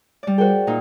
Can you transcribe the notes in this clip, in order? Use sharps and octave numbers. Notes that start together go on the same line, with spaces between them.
G3 D5
F#4 G#4 A#4 C5 G5
A#2 D#4 F4